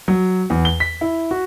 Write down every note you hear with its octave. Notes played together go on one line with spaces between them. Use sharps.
F#3
E2
G7
B6
E4
F#4